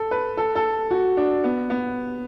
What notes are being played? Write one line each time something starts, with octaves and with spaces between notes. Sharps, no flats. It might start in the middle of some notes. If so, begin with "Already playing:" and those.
Already playing: A4
B4
A4
A4
F#4
D4
B3
B3